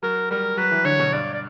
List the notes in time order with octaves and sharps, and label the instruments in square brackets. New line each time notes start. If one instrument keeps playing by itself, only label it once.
[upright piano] F#3 [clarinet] A#4
[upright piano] G3 [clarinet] A#4
[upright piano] F#3 [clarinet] B4
[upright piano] E3
[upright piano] D3 [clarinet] C#5
[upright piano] B2
[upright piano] G2 [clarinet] D5
[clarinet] D5